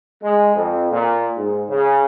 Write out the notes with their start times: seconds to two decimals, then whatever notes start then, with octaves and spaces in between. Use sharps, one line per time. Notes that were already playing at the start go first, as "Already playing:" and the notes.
0.23 G#3
0.55 F2
0.91 A#2
1.37 G#2
1.69 C#3